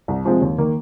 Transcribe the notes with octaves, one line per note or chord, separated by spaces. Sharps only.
C2
C3 F3 G#3 C4
D#2
D#3 A#3